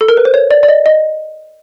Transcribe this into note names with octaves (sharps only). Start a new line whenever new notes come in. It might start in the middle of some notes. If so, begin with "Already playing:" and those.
A4
A#4
B4
C5
C#5
D5
D5
D#5
D#5